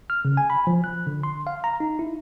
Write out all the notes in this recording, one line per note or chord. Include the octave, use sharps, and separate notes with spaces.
F6
C#3
G#5
B5
F3
F#6
D3
C6
F5
A#5
D#4
E4